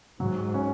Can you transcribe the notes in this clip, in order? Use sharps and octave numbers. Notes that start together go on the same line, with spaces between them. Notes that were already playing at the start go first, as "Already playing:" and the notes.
G#2 F#3
C#4